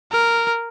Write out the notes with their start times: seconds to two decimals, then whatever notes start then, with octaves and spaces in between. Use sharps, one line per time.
0.12 A#4